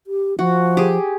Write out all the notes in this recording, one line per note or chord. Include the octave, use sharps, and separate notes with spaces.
G4
F3 F#4
G4 G#4